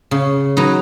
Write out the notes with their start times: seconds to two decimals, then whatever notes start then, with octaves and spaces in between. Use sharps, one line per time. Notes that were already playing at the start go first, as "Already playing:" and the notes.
0.11 C#3
0.57 F#3 D#4 B4